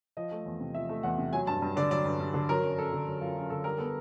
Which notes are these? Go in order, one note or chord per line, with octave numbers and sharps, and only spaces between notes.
F3 D#5
A3
E2
C3
F3 E5
A3
E2 F#5
C3
F#3 G#5
G2 A5
G2
D3 D5
F#3 D5
G2
G2
D3
F#3 A#4
F#2
F#2 A4
D3
F#3
F#2 F4
F#2
D3 A4
G3 A#4
B3 A4